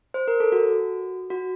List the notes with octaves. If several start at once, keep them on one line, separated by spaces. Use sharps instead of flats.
C5
A#4
A4
F#4
F#4